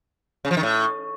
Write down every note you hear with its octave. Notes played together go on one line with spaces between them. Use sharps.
C#3
F3
D#3
A2